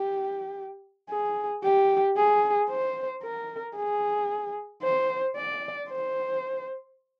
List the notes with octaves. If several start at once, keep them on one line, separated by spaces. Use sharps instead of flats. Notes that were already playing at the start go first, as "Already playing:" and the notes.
Already playing: G4
G#4
G4
G#4
C5
A#4
G#4
C5
D5
C5